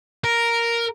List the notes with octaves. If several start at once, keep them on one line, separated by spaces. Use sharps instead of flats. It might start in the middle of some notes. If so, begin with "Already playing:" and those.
A#4